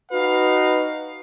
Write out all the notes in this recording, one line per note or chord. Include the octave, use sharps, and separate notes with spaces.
D#4 F#4 B4 F5